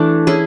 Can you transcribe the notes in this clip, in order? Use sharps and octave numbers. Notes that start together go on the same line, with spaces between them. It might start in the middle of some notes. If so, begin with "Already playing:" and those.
Already playing: E3 A3 D4
C#4 E4 G#4